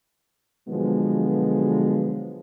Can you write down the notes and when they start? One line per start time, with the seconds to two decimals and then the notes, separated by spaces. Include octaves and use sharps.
0.69 B2 D3 F3 F#3 G#3 B3